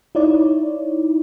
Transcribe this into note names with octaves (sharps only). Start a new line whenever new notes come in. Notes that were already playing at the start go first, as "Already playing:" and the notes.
D#4 E4 C#5 D5